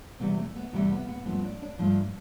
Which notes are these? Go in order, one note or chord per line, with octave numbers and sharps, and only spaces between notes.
E2 C3 E3 G3 B3
A3
B3
E2 C3 E3 G3 A3
B3
B3
G2 F3 A3 B3
D4
D4
G2 F3 A3